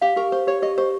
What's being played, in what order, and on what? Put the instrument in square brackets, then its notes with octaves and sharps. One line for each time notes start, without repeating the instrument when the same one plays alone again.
[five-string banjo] G4 [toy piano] F5
[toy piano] G4 [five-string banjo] A#4
[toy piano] G4 [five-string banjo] C5
[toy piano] G4 [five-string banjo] C#5
[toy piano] G4 [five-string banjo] D#5
[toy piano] G4 [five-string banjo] C5